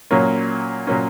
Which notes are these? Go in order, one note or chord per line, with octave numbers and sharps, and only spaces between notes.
A#2 F#3 A#3 C#4
A#2 F#3 A#3 C#4